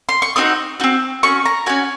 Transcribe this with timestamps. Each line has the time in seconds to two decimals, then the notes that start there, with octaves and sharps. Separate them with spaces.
0.09 C6
0.22 C#6
0.36 C4 D#4 F#4 D#6
0.80 D#4 F#4
0.84 C4
1.23 C#4 F#4 C#6
1.45 A#5
1.66 C#4 F#4 G#5